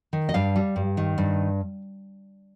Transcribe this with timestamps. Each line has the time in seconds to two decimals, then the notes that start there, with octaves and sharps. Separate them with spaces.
0.13 D#3
0.29 D#5
0.34 G2 F5
0.56 G3
0.76 G2
0.97 D#3
1.18 G2